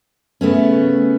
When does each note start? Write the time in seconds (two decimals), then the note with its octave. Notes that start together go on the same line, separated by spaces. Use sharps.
0.41 C#3 A3 B3 C#4